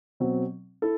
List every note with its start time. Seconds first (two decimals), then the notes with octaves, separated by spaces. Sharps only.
0.20 B2 F#3 C4
0.82 E4 A4